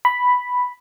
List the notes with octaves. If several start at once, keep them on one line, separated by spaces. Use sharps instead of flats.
B5